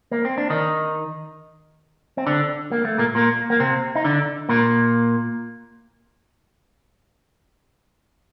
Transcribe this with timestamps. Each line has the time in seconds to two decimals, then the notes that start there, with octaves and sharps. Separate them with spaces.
0.11 A#3
0.25 C4
0.38 D4
0.50 D#3 D#4
2.17 C4
2.27 D3 D4
2.72 A#3
2.85 A3
2.98 A#2 A#3
3.15 A#2 A#3
3.50 A#3
3.60 C3 C4
3.95 D#4
4.05 D3 D4
4.49 A#2 A#3